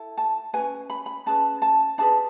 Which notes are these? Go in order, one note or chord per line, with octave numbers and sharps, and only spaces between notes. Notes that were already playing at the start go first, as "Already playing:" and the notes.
Already playing: E4 A4
A5
C#4 F#4 B4 G#5
B5
B5
C#4 G#4 B4 A5
A5
D4 G#4 B4 A5